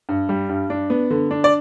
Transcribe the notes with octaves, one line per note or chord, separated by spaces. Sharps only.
G2
G3
G2
D4
B3
D3
D4
D5